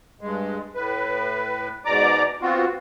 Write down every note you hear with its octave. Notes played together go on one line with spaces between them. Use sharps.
G2 G#3
A2 B4
G#2 B2 D5 A#5 D6
B3 C4 F4 F#4